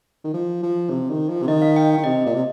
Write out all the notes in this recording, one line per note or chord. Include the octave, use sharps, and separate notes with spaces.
D#3
F3
F3
C3
D#3
F3
C3
D#3 D#5
F5
G5
D#3
C3 D#5
A#2
C3